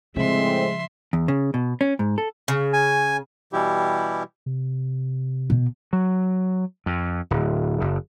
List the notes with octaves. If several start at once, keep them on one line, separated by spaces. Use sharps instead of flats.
A2 C#3 F3 G#3 C4 E5 C6
E2
C#3
B2
C#4
G#2
A4
C#3
G#5
B2 E3 G3 E4 G4
C3
B2
F#3
F2
D1
F#1